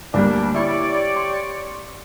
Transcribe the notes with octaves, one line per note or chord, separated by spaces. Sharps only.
D2 G3 A#3 D4
E4 G4 C#5 D5
C6